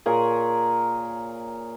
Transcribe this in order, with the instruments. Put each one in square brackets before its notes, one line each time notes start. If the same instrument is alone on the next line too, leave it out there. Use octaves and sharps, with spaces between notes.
[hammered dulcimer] A#2 G#4 A#4 C#5